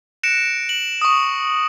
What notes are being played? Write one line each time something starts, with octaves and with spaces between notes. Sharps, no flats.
F#6 A#6 C#7 D7 E7
F#7
C#6 D#6